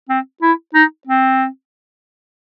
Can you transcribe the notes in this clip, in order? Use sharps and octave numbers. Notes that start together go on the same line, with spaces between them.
C4
E4
D#4
C4